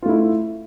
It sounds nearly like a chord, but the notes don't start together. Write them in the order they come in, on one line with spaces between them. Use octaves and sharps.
F4 A3 E4